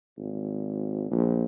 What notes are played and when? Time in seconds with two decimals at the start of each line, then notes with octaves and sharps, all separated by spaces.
0.18 G#1
1.11 A#1